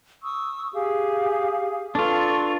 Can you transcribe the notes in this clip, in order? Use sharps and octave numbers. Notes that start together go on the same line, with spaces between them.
C#6 D#6 E6
G4 G#4 F5
D4 F4 A4 B4 C#6